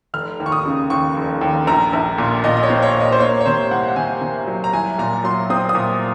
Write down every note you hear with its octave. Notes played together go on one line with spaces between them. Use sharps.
F1 F6
D#2
C#6
D#6
C#3
D#2 C#6
F1
D#2
A#1 A#5
A#1
A#2
A#2 D#5
D#5
C#5
C4
C#5
A#2
D#5
C5
A#3 C#5
C#5
C3 C5
C2 F#5
F#5
C3 G#5
C3
F#3
A#5
C2 G#5
A#2 A#5
F#3 C6
C4 D#6
D#6
A#2